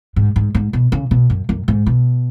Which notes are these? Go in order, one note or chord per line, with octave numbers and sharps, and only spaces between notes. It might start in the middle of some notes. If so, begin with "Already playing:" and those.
G#2
G#2
G#2
B2
C#3
B2
F#2
F#2
G#2
B2